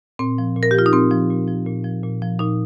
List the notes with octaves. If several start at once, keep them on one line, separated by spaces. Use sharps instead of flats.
A#2 C4
F3
A#2
A#4
G4
F3 F4
D#4
A#2 C4
F3
A#2
F3
A#2
F3
A#2
F3
A#2 D#4